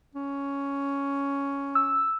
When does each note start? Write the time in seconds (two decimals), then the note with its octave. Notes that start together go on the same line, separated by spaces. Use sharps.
0.15 C#4
1.75 E6